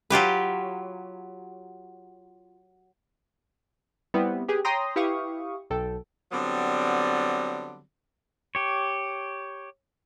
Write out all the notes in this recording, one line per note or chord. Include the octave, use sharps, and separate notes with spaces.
F#3 F4 G4 B4
G3 B3 C4 E4
G4 G#4 B4
C#5 G5 A#5 C6 D#6 A#6
E4 G4 B4 F5 C#6 D#6
B1 A4 G5
D3 F#3 G3 B3 C4
G4 C#5